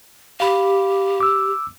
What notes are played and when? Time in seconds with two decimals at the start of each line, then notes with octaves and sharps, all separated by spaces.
0.40 G4 F5 B5
1.20 D6 E6